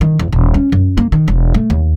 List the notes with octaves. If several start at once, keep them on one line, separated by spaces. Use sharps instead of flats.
D#3
E2
D#1
C#4
F#2
A#3
D#3
E1
A3
D#2